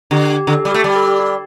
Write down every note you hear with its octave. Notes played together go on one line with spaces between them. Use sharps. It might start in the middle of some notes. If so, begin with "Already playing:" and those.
D3 G4
G4
D3 A4
G4
G3
A3 G4
G3
G4
A4
G4
G4